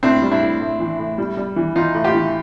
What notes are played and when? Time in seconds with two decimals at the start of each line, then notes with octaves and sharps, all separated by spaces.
0.03 A2 C4 D4
0.22 G3
0.31 D4 E4
0.42 A2
0.60 A2
0.80 E3
0.99 A2
1.18 G3
1.37 G3
1.56 E3
1.76 E3 D#4 F4
1.94 A2
2.04 F4 G4
2.14 E3